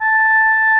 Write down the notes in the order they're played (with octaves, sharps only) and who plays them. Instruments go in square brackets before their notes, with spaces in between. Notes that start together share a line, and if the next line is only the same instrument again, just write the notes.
[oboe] A5